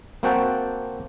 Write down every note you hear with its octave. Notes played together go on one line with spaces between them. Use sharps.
A#3 C4 F#4 F#5 G5 A5